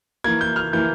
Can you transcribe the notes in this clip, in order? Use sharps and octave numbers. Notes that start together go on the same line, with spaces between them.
E3 A#3 G#6
G6
F6
E3 A#3 G6